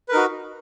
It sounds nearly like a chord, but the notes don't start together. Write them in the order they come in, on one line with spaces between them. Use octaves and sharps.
B4 A#4 D#4 F#4